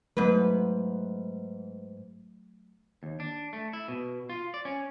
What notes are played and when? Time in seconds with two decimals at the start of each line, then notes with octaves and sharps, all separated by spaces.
0.17 G#2 F#3 A3 B3 B4
3.03 D#2
3.20 D4
3.53 A3
3.73 E4
3.88 B2
4.30 F4
4.54 D5
4.65 C#4